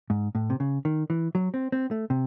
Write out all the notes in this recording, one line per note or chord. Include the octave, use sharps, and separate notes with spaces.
G#2
A2
C3
C#3
D#3
E3
F#3
C4
C4
A3
C3